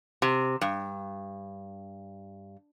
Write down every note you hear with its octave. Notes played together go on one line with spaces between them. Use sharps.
C3
G2